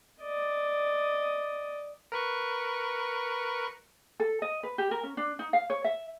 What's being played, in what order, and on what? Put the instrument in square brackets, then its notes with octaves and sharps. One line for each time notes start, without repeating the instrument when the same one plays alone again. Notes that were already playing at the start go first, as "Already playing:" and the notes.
[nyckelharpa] D5 D#5
[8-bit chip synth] A#4 B4 C#6
[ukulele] A4
D#5
B4
G4
A#4
C#4
D4
D#4
F5
C#5
E5